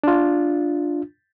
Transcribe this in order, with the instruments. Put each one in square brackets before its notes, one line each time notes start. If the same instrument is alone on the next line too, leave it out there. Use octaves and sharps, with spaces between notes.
[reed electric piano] D4 F4